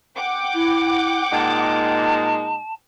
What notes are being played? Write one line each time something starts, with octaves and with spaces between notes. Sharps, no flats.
F#5 G5 D6
E4
A#2 G#3 D#4 A5